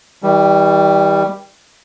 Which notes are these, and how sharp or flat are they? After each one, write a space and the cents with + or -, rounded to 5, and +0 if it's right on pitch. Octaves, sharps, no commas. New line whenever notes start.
E3 -45 G3 +5